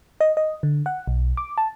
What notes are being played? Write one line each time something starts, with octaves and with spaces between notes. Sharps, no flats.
D#5
D#5
D3
F#5
B1
D6
A5